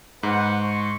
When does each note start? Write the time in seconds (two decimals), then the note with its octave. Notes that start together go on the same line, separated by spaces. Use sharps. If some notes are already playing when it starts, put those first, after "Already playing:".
0.23 G#2 B4 C5 F#5
0.61 C6 C#6